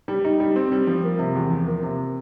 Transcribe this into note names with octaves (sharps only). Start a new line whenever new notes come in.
G3
D#4
G3
C4
G3
F3
A#3
C3
E2
F3
A#3
C3